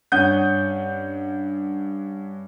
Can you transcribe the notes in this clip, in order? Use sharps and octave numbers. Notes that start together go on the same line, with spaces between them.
G2 C#4 F#5 D#6 G6